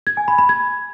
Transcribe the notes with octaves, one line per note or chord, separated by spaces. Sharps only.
G#6
G#5
B5
B5
G#6